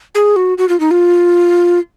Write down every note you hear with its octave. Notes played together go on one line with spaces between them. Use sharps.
G#4
F#4
F#4
F4
D#4
F4